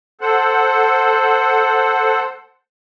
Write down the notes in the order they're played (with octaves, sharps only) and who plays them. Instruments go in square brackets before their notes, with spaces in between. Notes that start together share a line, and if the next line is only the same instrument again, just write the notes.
[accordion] A4 C5 F#5